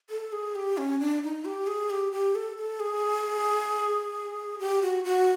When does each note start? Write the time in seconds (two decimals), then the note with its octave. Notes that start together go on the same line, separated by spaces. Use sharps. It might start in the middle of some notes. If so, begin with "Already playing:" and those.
0.10 A4
0.32 G#4
0.55 G4
0.77 C#4
0.99 D4
1.23 D#4
1.45 G4
1.67 G#4
1.90 G4
2.12 G4
2.35 A4
2.57 A4
2.80 G#4
4.59 G4
4.82 F#4
5.04 F#4